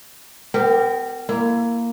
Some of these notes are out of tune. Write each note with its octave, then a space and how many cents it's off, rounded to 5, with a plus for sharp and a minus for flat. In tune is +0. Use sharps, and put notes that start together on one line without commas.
B3 +40 G4 +10 A#4 -20
A#3 +0 E4 +25